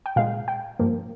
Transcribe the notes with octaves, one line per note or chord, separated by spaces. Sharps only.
G5
A#2 G#3 F5
G5
G2 F3 A#3